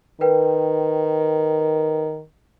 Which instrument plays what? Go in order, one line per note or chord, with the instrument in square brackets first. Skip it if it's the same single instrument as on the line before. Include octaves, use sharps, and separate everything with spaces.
[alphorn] D#3 [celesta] A#4 B4 G5